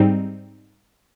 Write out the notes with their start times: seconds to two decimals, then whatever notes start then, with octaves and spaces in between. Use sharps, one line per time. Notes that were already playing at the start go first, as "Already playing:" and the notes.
Already playing: G#2 G3 C4 D#4